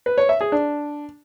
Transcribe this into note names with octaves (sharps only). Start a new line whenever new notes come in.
B4
C#5
E5
G#4
D4